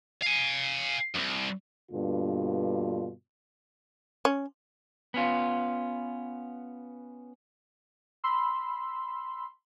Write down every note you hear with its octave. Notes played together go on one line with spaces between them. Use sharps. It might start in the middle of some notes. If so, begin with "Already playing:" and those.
F5 G#5
C2 F#2
G2 B2 D3 A#3 F4
C#4
B3 C#4 F4
B5 C6 E6